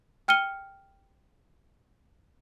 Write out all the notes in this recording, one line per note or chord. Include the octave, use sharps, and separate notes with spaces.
G5 F6 C#7 D#7 G7